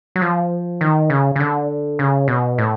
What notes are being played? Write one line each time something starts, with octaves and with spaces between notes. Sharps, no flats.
F#3
F3
D#3
C#3
C#3
D3
C#3
B2
A2